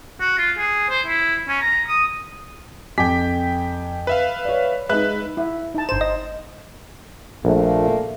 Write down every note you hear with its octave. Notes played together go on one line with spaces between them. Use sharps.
F#4
F4
G#4
C5
E4
C#4
A#5
D#6
F2 G5 G#5 D6 B6
B4 E5 F5
C#5 D5
G#3 D#4 B4 E5 F#6
E4
D#4 A5
G1 C5 E7
D#5
A#1 A#2 A3 A#3